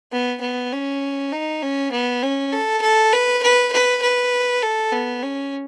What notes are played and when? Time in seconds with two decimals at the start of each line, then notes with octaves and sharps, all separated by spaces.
0.12 B3
0.41 B3
0.72 C#4
1.32 D#4
1.62 C#4
1.91 B3
2.23 C#4
2.52 A4
2.81 A4
3.12 B4
3.43 B4
3.72 B4
4.02 B4
4.62 A4
4.92 B3
5.22 C#4